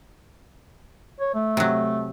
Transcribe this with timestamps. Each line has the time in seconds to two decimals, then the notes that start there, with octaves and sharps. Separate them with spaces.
1.20 C#5
1.34 A3
1.57 C3 F#3